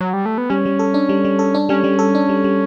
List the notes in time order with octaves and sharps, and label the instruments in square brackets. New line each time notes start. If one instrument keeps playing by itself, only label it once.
[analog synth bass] F#3
G3
A3
B3
[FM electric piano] G3 [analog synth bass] C#4
[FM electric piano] G3
A4
D4
G3
G3
A4
D4
[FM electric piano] G3 [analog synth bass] C#4
[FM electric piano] G3
A4
D4
G3
G3